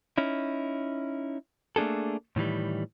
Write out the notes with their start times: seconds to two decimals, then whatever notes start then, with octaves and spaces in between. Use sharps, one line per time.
0.18 C#4 D#4 E4
1.76 A3 A#3 D4 G#4 A4
2.36 A2 D#3 E3 G3